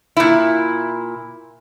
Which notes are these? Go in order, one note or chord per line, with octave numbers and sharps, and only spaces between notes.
A#2 E4